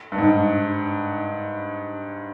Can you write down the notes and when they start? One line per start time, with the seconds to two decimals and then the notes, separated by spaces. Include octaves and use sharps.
0.12 G2
0.18 G#2